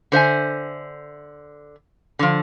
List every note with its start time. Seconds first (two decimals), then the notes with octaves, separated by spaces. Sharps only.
0.12 D3 C5 E5 G#5
2.19 D3 F3